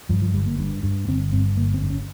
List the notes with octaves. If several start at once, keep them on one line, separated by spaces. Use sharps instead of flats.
G2 F3
F3
G1 G3
A#3
G2
G2
G1 C4
G2 C4
G1 A#3
C4
G2
C#4